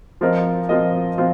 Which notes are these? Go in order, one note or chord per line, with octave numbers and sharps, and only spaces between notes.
F3 C4 F4 A#4 D#5
F3 C4 F4 A#4 D#5
F3 C4 F4